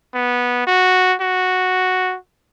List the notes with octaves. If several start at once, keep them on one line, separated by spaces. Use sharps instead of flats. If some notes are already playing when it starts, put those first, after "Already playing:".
B3
F#4
F#4